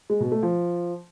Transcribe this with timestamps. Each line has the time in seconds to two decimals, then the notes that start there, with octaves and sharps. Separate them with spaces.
0.10 G#3
0.21 B2
0.32 A3
0.43 F3